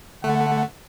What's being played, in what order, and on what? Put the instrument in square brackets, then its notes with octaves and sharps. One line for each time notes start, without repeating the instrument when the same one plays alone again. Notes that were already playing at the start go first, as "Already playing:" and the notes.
[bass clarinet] D3 [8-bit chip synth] A3 [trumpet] F#5